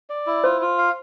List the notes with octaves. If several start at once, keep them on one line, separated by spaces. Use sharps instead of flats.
D5
E4
F4 C5
F4
F5